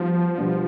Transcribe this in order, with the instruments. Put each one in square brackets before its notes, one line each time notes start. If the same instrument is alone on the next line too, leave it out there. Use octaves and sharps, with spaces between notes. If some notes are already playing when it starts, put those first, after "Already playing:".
Already playing: [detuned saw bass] F3 [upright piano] G3 B3 D#4 F#4
[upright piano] B2 G3 B3 D4